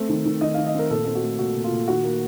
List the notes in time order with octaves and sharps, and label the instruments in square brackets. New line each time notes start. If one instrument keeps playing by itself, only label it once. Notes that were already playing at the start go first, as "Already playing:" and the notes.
Already playing: [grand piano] A3 C4
D#3
D#3
D#3 D#5
F5
D#3
D#5
C4 A#4
A#2 A4
C4 A4
F#4
A3
A#2 F#4
A#2
F4
A#2
D#3 F#4
A#3